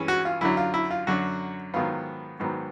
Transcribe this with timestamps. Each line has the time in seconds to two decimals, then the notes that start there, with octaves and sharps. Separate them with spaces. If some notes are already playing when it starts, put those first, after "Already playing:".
Already playing: G2 E3 G#3 C#4
0.08 F#4
0.25 F4
0.41 F#2 D3 F#3 E4
0.57 F4
0.74 E4
0.91 F4
1.07 F#2 D3 F#3 F#4
1.74 G#2 D#3 F#3 B3 F4
2.40 G#2 D#3 F#3 B3